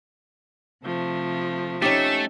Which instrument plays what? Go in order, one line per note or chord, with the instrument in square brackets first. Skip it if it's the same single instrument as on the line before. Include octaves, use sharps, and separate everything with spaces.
[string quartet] C3 F3 A3
[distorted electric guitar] A3 [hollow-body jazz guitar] C#4 D#4 G4 [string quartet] E6